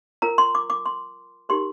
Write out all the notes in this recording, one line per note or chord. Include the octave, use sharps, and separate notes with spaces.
F4 A#4 A#5
C6
D6
D6
C6
D#4 G4 A#4 C6